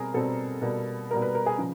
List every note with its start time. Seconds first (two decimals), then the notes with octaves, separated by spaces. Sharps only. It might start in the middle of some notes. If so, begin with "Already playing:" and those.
Already playing: B2 G3 C4 G#4 A#4
0.14 B2 G3 C4 A4
0.62 B2 G3 A#3
1.11 B2 G3 A#3 A#4
1.22 B4
1.35 A#4
1.46 G#4
1.58 C#3 F3